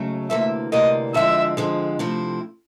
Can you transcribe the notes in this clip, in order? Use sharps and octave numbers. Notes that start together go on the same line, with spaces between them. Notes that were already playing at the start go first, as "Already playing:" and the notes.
Already playing: D#2 C#3 F#3 A3
D2 C3 E3 G3 A#3 E5
D2 C3 E3 G3 A#3 D#5
F2 D3 F3 G#3 C4 E5
F2 D3 F3 G#3 C4
C3 F3 A3 C4 E4